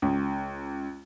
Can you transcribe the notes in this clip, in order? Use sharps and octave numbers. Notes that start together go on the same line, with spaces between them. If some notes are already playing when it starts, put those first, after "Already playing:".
C#2